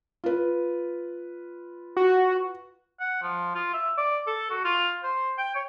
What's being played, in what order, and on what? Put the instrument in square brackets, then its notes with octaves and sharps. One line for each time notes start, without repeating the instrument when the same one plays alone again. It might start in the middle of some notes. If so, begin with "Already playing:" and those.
[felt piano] F4 B4
[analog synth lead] F#4
[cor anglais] F#5
F3
F4
E5
D5
A4
F#4
F4
C5
G5
C#5